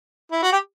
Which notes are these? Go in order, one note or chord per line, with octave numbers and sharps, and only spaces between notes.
E4
F#4
G4